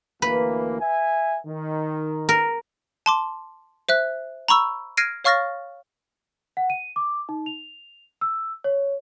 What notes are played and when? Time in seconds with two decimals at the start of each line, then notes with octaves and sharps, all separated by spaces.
0.22 D2 E3 A#3 B4
0.81 E5 G#5
1.46 D#3
2.29 A#4
3.06 A5 C6 D6
3.89 C5 E5 F#6
4.48 A#5 B5 C#6 E6
4.97 F6 G#6 A#6 C7 D7 D#7
5.24 C#5 F5 C#6 F6 A6 A#6
6.57 F#5
6.70 D#7
6.96 D6
7.29 D#4
7.46 F7
8.21 E6
8.64 C#5